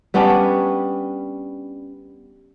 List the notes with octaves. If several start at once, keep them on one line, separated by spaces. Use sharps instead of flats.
G3 B3 C#4 D4